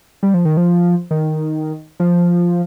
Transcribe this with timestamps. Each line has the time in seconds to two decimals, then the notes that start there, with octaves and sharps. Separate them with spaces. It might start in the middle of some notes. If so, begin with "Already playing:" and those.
0.23 G3
0.34 F3
0.45 D#3
0.57 F3
1.11 D#3
2.00 F3